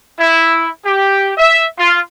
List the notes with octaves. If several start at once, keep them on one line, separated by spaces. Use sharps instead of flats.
E4
G4
E5
F4